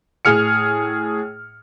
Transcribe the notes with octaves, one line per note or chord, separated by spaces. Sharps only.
A2 G#4 F6 C#7